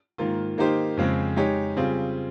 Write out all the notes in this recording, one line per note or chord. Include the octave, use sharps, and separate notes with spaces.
G#2 D#3 A#3 F4
D#3 A#3 D#4 G4 C5
F2 C#3 G#3 C4
G#3 D#4 G4 C#5
C#3 G3 C4 F4 G#4